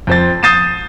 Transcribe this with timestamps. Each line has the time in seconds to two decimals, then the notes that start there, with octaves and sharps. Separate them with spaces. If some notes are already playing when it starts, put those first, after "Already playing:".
0.07 F2 C5 A6
0.43 D#6 G6 A6 C7 D#7 E7